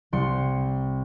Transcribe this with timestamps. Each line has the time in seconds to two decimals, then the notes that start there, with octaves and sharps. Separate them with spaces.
0.13 C2 C6 C#7